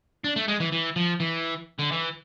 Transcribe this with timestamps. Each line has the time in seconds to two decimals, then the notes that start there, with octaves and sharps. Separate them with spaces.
0.24 D4
0.36 A3
0.48 G#3
0.60 E3
0.72 E3
0.96 F3
1.20 E3
1.79 D3
1.92 E3